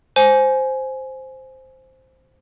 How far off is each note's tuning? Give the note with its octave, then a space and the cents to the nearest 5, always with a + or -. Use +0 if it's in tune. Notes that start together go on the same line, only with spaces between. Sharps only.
C5 +0 G#5 +15